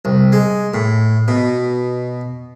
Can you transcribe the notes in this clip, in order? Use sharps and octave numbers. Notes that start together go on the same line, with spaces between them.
C2
G#3
A2
B2